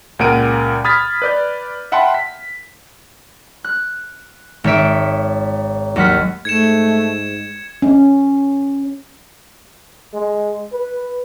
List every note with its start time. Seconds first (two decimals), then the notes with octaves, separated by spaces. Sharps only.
0.19 C#2 A#2 A#4 F#5 D7 D#7
0.84 B5 D#6 F6 G#6 A6 B6
1.22 B4 D5 G6
1.92 E5 F#5 G5 A5 B5 C6
2.14 B6
3.64 F#6
4.64 G#1 C#5 E5 D7
5.96 D#2 F#3 F#5 F6 B6
6.45 G#2 A3 G#6 C#7 E7
7.82 C#4
10.14 G#3
10.73 B4